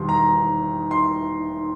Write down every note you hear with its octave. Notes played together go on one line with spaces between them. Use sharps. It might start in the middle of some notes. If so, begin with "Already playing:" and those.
Already playing: E1 D#2 D#3 G3 C6
A#5
C6